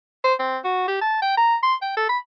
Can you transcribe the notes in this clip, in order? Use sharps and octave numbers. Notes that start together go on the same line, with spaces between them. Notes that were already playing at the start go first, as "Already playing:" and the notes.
C5
C4
F#4
G4
A5
G5
A#5
C6
G5
A4
B5